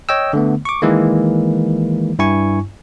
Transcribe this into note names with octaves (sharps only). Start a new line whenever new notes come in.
C#5 D#5 G5 E6
D3 A3 B3
C#6 D6
D#3 E3 G#3 A#3
G2 E4 G#5 C#6